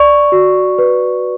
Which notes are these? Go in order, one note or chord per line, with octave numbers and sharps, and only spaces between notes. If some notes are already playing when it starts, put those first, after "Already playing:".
Already playing: D5 C#6
F#4
B4